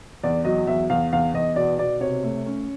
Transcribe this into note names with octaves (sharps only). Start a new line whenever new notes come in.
E2 D5
F#3 D#5
E2 E5
E2 F5
E2 F5
E2 D#5
B2 D5
B2 D5
C3 C#5
A3
C#4